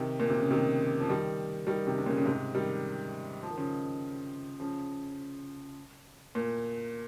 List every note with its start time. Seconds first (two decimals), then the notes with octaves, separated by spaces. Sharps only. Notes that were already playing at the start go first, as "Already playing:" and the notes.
Already playing: C3 D#3
0.20 A#2
0.29 C3
0.40 C#3
0.51 C3 D#3
1.00 F3
1.09 D#3 G3
1.67 D#3 G3
1.87 C3 D#3
1.98 C3
2.06 A#2 C#3
2.17 C#3
2.26 G#2 C3
2.55 D#3 G3
3.43 F3
3.50 D#3
3.57 C#3 F3
4.60 C#3 F3
6.35 A#2